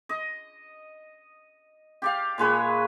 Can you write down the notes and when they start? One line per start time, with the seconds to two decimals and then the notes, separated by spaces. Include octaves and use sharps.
0.09 D#5
2.02 G4 D5 F5
2.38 A#2 G#3 B4 C#5